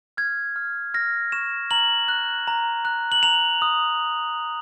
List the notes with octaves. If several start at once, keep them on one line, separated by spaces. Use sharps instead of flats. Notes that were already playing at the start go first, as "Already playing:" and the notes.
F6 G#6
F6
F6 A#6
C#6 E7
A#5 F#7
F#6
A#5
F#6
F#7
A#5 F7
D#6